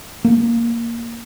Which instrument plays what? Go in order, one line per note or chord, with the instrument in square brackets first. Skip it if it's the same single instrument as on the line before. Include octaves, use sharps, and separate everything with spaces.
[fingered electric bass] A#3